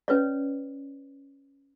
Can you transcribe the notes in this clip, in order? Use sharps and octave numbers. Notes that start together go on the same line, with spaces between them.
C#4 B4 C#5 D5